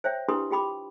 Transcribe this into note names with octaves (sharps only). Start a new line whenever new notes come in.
C5 C#5 E5 G5
D4 E4 G4 B4 C6 D#6
F4 G4 G5 B5 D6